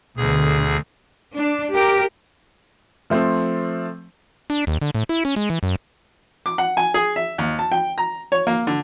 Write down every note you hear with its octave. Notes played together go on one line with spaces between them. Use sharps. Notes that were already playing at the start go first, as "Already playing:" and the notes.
D2 B2 D3 G#4
D4
G4 A#4
F3 A3 C4
D4
D#2
D3
A2
E4
C#4
G#3
E3
F#2
D6
F#5
G#5
G#4
E5
D#2
A5
G5
A#5
C#5
A#3
D3